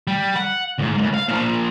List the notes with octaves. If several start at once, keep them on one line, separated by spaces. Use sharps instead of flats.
G3
F#5
D2 G#2
C#2 F#2
F5
A#2 F3